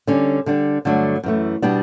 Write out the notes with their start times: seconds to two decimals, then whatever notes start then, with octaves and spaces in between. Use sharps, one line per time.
0.07 D3 G3 C#4
0.46 D3 G3 D4
0.85 G2 D3 F#3 A3 D4
1.23 F#2 E3 A3
1.62 B2 G3 B3 D4